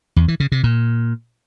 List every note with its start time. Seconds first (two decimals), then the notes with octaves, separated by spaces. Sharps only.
0.16 E2
0.28 E3
0.40 C#3
0.52 C3
0.64 A#2